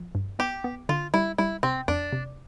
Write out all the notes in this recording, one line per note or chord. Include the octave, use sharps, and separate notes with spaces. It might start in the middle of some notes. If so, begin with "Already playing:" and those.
Already playing: F3
G2
B3 G4
B3
D3 F4
G3 E4
G3 E4
C3 C4
F2 D4
C3